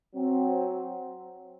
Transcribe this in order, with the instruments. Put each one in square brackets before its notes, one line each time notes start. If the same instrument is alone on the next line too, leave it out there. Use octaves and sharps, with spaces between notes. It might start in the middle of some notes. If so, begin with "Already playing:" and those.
[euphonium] F#3 [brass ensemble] C4